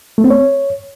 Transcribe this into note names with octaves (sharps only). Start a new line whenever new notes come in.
A3
C4
C#5